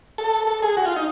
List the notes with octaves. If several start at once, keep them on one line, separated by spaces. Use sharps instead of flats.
A4
A4
G#4
F#4
F4
D#4